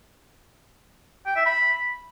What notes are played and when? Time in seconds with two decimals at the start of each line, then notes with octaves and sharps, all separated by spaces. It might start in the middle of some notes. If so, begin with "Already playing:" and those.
1.26 G5
1.36 E5
1.46 B5